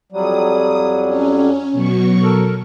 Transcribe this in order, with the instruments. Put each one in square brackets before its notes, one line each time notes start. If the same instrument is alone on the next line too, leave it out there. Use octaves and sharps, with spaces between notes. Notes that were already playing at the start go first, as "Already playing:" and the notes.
[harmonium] F2 F#3 G3 [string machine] D#6
[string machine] C#4
B2 F#3 C#6
[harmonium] A4 A#4